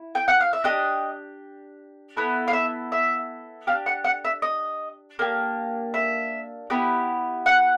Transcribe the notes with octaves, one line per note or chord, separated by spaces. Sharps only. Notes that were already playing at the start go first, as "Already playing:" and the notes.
Already playing: E4
G5
F#5
F5
E5
D4 G4 D#5
B3 E4 A4
F5
E5
E5
D4 G4 F5
F#5
F#5
E5
D#5
A#3 D4 G4
E5
B3 E4 G4
F#5